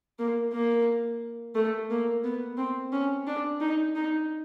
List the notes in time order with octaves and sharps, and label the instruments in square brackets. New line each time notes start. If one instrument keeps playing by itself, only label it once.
[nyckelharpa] A#3
A#3
A3
A#3
B3
C4
C#4
D4
D#4
D#4